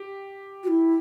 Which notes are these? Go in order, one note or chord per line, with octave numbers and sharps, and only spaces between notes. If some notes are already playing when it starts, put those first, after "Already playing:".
Already playing: G4
F#4
E4